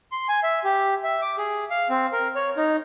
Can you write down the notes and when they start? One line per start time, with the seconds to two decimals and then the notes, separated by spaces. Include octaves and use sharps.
0.12 C6
0.29 G#5
0.43 E5
0.64 G4
1.04 E5
1.22 D6
1.38 G#4
1.70 F5
1.90 C4
2.13 A#4
2.36 C#5
2.57 D#4